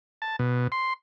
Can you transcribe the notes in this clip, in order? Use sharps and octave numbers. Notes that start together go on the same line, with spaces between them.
A5
B2
C6